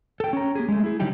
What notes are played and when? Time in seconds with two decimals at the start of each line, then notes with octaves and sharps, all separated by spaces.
0.20 A4 G5
0.33 C#4 A#5
0.55 A#3 G4 G#4
0.68 G#3 A3
0.84 E4 G#4
1.00 D3 F#3 G3 D#4 G4